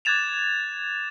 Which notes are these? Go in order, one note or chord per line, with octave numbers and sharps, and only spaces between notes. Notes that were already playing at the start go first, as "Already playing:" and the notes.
D6 F#6 G#6 A6 E7 F7